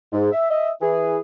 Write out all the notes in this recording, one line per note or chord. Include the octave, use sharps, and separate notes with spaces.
G#2
E5
D#5 E5
E3 G#4